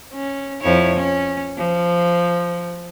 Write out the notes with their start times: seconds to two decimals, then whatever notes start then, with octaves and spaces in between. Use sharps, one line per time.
0.13 C#4
0.62 F2 E4 C#5
0.96 C#4
1.57 F3